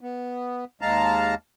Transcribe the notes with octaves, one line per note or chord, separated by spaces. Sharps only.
B3
D#2 G#3 F5 A5 A#5